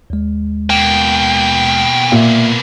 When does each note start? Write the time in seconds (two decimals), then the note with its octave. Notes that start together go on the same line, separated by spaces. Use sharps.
0.10 D#2 G#3
0.70 B2 A#3 G5
2.12 A#2 E5 F5